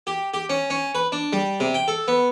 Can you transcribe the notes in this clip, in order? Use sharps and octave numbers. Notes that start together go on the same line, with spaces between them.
G4
G4
C#4
C#4
B4
D4
G3
C3
G5
A4
B3